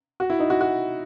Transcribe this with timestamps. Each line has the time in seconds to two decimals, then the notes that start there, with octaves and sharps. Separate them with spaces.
0.20 F#4
0.30 E4
0.39 D#4
0.50 F#4
0.61 F#4